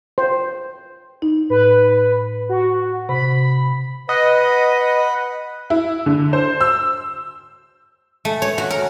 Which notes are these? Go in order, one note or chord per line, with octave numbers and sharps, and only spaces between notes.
C5
D#4
A2 B4
F#4
C3 B5
B4 D#5 F#5 B5
E4
D3
C5
E6
A3
C#5
F#4
A#4